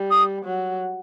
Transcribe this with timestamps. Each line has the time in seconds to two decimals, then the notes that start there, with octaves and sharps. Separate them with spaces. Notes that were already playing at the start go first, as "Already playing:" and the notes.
Already playing: G3
0.11 D#6
0.45 F#3